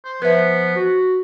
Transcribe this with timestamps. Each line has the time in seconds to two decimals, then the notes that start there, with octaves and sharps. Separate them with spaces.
0.05 C5
0.22 F3 B3 B4 E5
0.76 F#4